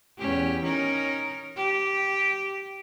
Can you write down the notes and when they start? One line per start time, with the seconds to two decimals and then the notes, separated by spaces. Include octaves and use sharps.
0.18 E2 C#4 G4
0.63 C#4 D#4 A#4
1.56 G4